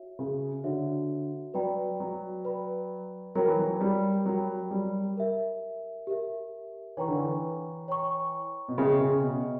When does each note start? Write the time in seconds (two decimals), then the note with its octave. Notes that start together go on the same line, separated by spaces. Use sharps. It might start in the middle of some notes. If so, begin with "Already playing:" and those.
Already playing: F#4 C#5 E5
0.19 C#3
0.64 D3 F#4 C#5 E5
1.54 F#3 B4 D5 G5 B5
2.00 F#3
2.45 B4 D5 G5 B5
3.35 F#3 A#4 C#5 G5 B5
3.47 E3
3.59 F#3
3.81 G3
4.25 F#3 A#4 C#5 G5 B5
4.71 G3
5.16 G4 A#4 E5
6.07 G4 A#4 E5
6.97 E3 C#5 G5 A#5 C#6
7.08 D3
7.18 E3
7.88 C#5 G5 A#5 C#6
8.68 B2
8.78 C#3 C#5 E5 G5 C#6
9.01 C#3
9.23 B2